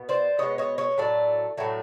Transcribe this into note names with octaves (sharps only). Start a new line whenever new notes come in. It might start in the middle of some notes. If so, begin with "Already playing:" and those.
Already playing: B2 B3
C5 D5
B2 G#3 B3 C#5 D#5
C#5 D#5
C#5 D#5
A2 F#3 A3 D5
A2 F#3 A3